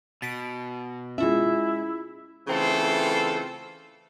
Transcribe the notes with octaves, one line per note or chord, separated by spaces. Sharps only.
B2 A6 B6 D7
G#3 C#4 E4 F4 E5
C#3 E3 A3 C4 F4 A4